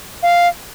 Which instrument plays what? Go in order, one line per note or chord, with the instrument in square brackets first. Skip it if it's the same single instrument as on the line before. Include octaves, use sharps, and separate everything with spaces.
[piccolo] F5